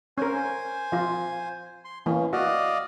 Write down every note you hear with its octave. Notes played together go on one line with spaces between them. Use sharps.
C#4 A#4 C5 G#5
F3 F4
C6
E3 A#3 C#4
F#4 D5 D#5 F5